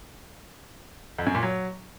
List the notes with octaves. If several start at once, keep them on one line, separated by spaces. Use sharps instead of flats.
F2
F#2
A#2
F#3